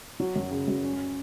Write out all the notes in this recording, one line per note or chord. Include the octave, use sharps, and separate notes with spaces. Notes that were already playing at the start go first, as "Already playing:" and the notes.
F#3
F#2
C#3
F#2
C#4